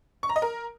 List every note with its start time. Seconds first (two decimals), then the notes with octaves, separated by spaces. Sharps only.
0.23 C#6
0.29 A#5
0.36 D#5
0.42 A#4